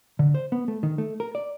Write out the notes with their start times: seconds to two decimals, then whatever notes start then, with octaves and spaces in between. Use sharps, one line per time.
0.19 D3
0.35 C5
0.52 B3
0.68 A3
0.83 D#3
0.98 A3
1.20 A#4
1.35 D5